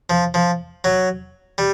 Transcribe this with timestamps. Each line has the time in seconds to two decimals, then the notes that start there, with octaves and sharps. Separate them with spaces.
0.10 F3
0.34 F3
0.84 F#3
1.58 G3